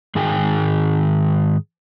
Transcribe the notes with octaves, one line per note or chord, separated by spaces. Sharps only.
G#2 D#3 G#4 G5 G#5